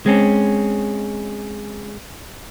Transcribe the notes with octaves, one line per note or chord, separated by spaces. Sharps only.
G#3 C4 C#4